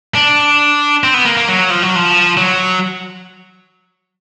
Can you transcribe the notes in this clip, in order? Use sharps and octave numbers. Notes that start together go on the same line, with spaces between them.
D4
C4
B3
A#3
A#3
F#3
F3
F#3
F3
F#3